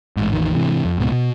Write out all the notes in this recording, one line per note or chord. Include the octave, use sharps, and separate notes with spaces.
A1 G#2
A1 E2 D#3
G#2 C3 E3
F2
C#2 G#2 B2
B2